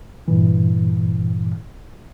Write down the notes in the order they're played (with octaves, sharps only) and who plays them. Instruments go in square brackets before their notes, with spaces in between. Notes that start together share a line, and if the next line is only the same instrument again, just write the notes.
[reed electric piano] G2 A#2 E3